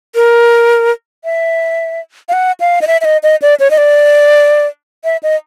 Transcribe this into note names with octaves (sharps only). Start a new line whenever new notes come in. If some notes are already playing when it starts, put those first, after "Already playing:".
A#4
E5
F5
F#5
F5
D#5
E5
E5
D#5
D#5
D5
C#5
D#5
D5
E5
D#5